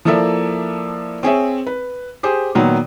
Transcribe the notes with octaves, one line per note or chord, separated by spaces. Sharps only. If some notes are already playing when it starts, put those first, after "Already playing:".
F3 A#3 E4 A4 D5 E5
C4 G#4 C#5 E5
B4
G4 G#4 C5
A#2 D#3 F#3 B3